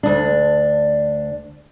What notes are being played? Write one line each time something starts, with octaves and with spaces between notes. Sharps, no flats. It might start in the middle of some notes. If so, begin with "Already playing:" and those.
D2 D4